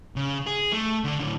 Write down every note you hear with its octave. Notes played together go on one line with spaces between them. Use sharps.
C#3
G#4
A3
D3 D4
A2 D3